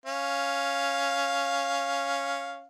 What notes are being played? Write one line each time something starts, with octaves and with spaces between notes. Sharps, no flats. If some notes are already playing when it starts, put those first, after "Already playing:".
C#4 F5